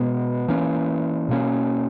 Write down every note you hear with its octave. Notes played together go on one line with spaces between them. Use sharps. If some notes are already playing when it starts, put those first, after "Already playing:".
Already playing: B2 G#3 B3
E3 A#3 C#4
B2 A#3 C#4